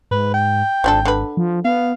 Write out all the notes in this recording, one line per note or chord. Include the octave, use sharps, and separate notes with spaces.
G#2 B4
G5
G#1 F3 D4 A4
D3 B4
F3
B3 F5